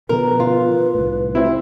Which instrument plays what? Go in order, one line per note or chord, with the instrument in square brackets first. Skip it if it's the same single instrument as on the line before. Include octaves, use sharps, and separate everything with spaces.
[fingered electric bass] B2 D3 F3 [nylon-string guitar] A#4 [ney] B4
[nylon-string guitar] F4
[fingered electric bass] C2 A2
[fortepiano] C4 E4